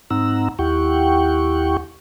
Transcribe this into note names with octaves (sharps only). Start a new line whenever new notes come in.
G#2 C4 D#4 F#5 A#5 E6
D#2 E4 G4 F#5 G5 C#6